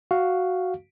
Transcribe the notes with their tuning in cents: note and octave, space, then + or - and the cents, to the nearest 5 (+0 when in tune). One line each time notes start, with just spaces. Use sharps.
F#4 +0 F5 +0